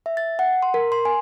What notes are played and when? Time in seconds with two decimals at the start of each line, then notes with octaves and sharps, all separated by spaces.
0.06 E5
0.17 A6
0.39 F#5
0.63 C6
0.74 A#4
0.92 C6
1.05 G#5